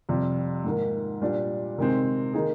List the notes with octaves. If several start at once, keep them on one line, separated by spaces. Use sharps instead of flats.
F2 C3 G3
G#2 D#3 A#3
A#2 G3 D4
C3 D#3 G#3 C4
D#3 A#3 D#4 G#4